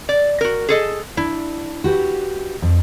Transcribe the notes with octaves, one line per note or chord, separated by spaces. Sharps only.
D5
F#4 A#4
G#4 A4 D#5
D4 E4
F#4 G4 B4
F2